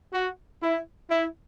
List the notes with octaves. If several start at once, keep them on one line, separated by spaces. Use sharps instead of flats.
F#4
E4
E4